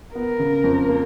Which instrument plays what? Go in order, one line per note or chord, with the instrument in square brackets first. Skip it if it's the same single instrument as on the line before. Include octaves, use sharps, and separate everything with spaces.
[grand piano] B3 [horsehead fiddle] A#4
[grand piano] C#3
F2
A#3